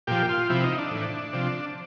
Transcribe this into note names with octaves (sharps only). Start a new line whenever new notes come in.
A#2 F3 G4
F4
C3 F3 E4
D#4
D4
A2 E3
C3 F3